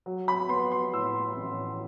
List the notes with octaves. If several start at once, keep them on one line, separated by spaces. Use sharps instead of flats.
F#3
B5
B3 C6
C6
A2 E6
A1